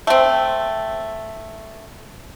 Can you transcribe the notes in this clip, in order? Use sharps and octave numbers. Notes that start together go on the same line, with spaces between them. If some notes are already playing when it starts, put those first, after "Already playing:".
A3 C4